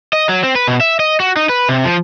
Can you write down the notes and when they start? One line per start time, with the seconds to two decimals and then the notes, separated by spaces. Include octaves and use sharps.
0.13 D#5
0.29 F#3
0.43 C4
0.56 B4
0.68 B2
0.81 E5
0.99 D#5
1.20 F#4
1.37 D#4
1.49 B4
1.69 C3
1.85 F3